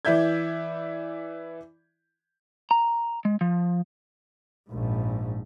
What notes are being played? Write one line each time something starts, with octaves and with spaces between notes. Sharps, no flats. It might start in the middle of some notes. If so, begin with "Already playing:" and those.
E3 E4 D5 E5 G6 G#6
A#5
G#3
F3
A#1 G#2